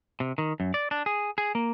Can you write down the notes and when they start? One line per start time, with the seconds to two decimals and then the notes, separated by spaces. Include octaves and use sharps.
0.20 C3
0.38 D#3
0.60 F#2
0.74 D5
0.91 D4
1.06 G#4
1.38 G#4
1.55 A#3